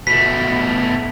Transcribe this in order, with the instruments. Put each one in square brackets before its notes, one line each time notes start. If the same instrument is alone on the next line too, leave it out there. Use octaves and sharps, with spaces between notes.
[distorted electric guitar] B2 A3 [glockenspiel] B6